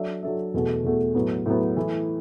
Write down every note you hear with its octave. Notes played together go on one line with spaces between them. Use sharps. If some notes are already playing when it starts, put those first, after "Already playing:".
Already playing: F#3 D4 A4 E5
F#3 D4 A4 E5
E2 B2 A3 F#4 A4
E2 B2 A3 F#4 A4
A2 F#3 B3
A2 F#3 B3
E3 A3 E4